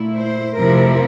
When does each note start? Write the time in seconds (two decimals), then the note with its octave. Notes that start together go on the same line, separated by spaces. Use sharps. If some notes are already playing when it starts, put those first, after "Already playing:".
Already playing: A#2 A3 E4
0.16 C5
0.57 F2 C3 F3 A3 E4 A#4